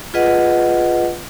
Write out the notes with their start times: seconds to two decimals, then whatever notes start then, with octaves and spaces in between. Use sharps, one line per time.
0.14 F4 G#4 B4 D#5 F#5